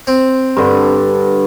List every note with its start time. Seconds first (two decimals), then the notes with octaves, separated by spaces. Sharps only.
0.07 C4
0.57 G2 D3